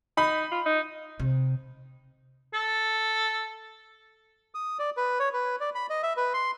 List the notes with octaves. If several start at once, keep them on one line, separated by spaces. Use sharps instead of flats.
D#4 B5
F4
D#4
C3
A4
D#6
D5
B4
C#5
B4
D5
B5
D#5
E5
B4
C6